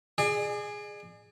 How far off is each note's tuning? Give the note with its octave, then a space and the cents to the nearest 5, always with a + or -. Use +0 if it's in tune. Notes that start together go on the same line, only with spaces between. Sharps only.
G#4 +0 D5 +40